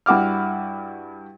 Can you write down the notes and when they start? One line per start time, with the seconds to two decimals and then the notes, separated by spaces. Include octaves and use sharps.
0.06 G2 E4 F#4 D6 F6